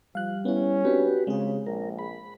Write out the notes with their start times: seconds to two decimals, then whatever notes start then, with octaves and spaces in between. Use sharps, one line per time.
0.15 F3 G3 F5 F#6
0.45 B3 C#4 E4
0.85 C4 D4 F#4 G4 B4
1.27 C#3 G#3 C4 G#4
1.67 A#1 A#4
1.99 B5